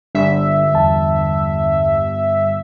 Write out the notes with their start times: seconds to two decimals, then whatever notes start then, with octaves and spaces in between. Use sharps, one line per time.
0.15 G1 G3 D4 E5
0.74 E2 A5